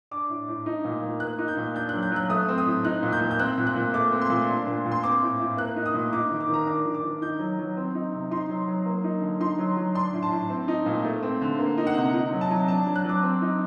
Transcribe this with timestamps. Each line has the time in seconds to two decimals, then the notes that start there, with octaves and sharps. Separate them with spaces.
0.11 D4 D6
0.30 A2
0.48 A2
0.66 D#4
0.85 A#2
1.03 A#2
1.20 A#3 F#6
1.39 D#4
1.48 G6
1.57 A#2
1.75 D4 G6
1.89 F#3 F#6
2.03 G6
2.12 F#3 F#6
2.30 A3 D#6
2.48 C4
2.58 D#6
2.66 A2
2.85 D#4 F#6
3.03 A#2
3.13 G6
3.21 A#2
3.31 G6
3.39 C4 F#6
3.58 A#2
3.67 F#6
3.76 A#2
3.94 A3 D6
4.12 C4
4.21 C6
4.30 A#2
4.49 D4
4.67 A#2
4.86 A#2
4.92 C6
5.03 C4 D6
5.22 A2
5.40 A2
5.57 A#3 F#6
5.76 D#4
5.86 D#6
5.94 A#2
6.13 D#4 D6
6.31 D#3
6.40 D6
6.49 D#3 A#5
6.67 D4 D6
6.86 D#3
6.94 D6
7.03 D#3
7.22 D#4 G6
7.40 F#3
7.59 F#3
7.77 C4
7.95 D#4
8.13 C3
8.31 D#4 C6
8.49 F#3
8.68 F#3
8.86 A#3
9.04 D#4
9.22 D3
9.40 D#4 C6
9.59 F#3
9.77 F#3
9.95 D4 C6
10.13 A2
10.23 A5
10.32 A2
10.49 C4
10.68 D#4
10.86 A#2
11.04 A3
11.23 C4
11.41 D3
11.59 A#3
11.78 D#4
11.87 F#5
11.96 C3
12.14 D#4
12.32 F#3
12.41 A5
12.51 F#3
12.68 D4 A5
12.87 F#3
12.96 F#6
13.05 F#3 D6
13.23 C4
13.42 D#4